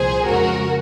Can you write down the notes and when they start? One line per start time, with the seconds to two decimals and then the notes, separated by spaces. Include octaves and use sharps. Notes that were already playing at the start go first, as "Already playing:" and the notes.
Already playing: C2 A#2 F3 G#4 C5
0.26 F2 C#3 G#3 F#4 A#4